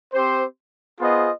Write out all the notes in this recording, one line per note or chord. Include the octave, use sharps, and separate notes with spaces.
C4 G4 C5
B3 F4 G#4 C5 D#5